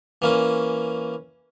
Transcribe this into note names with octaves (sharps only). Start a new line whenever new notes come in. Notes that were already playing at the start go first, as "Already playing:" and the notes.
E3 A#3 C#4